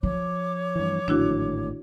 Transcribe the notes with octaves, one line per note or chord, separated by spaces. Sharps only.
F3 C#5 D6
G2 E3
G#1 A2 D3 D4 E4 F#4